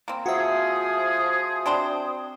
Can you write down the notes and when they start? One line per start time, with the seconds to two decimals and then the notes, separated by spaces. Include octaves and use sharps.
0.08 A#3 C4
0.26 F3 F#4 G#4 E5 D#6
1.66 C4 D4 C5